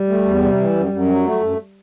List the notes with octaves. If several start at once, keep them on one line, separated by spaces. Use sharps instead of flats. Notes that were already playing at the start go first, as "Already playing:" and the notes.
Already playing: G3
A3
E2
C3
E3
F#2
F#2
F#3
A3
F#2